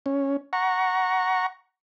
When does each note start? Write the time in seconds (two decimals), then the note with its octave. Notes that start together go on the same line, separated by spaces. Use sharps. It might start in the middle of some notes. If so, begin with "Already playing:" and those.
0.06 C#4
0.53 F#5 A#5 C#6